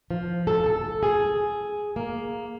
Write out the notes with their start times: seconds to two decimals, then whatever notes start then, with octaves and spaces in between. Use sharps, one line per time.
0.11 F3
0.47 A4
0.66 A4
1.03 G#4
1.96 A#3